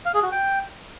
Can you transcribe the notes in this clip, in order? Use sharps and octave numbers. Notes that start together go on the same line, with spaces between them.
F5
G#4
F#4
G5